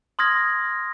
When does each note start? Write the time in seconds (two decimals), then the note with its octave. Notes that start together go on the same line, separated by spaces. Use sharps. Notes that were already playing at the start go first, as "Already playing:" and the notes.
0.19 C6 D#6 F6 G#6 A#6